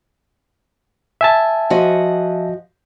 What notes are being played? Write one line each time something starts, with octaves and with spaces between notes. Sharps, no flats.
E5 G#5 A5
F3 F#4 D#5